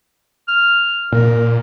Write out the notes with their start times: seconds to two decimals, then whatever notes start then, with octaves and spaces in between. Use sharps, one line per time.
0.48 F6
1.12 A#2 A#4